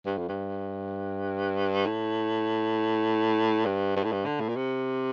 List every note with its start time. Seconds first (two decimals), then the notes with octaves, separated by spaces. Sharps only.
0.06 G2
0.18 F2
0.29 G2
1.86 A2
3.66 G2
3.96 G2
4.04 A2
4.12 G2
4.26 D3
4.40 A2
4.49 A#2
4.56 C3